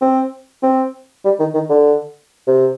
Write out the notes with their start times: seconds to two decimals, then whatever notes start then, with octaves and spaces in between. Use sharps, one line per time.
0.01 C4
0.63 C4
1.25 G3
1.39 D#3
1.54 D#3
1.70 D3
2.47 C3